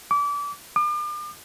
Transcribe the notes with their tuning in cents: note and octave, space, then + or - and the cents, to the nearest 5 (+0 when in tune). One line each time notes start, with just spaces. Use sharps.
D6 -30
D6 +40